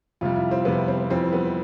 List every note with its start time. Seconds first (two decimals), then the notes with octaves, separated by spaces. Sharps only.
0.21 F2 C3 G3 F4
0.36 E4
0.51 C4
0.65 F2 C3 G3 B3
0.88 C4
1.10 F2 E3 G3 C4
1.33 B3